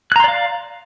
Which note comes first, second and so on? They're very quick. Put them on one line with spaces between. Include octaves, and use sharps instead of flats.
F#6 A#5 C6 D5 F5